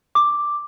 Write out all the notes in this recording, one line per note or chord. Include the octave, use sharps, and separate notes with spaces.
D6